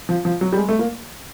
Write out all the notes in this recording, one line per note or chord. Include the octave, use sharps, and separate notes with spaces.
F3
F3
F#3
G3
G#3
A3
A#3